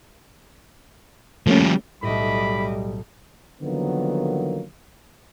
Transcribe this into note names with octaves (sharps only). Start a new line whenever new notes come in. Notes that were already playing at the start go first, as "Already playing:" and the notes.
F3 G3 A3 A#3 C#4
B1 A2 G3 D#5 E5 B5 D6
D3 D#3 F3 F#3 A#3 B3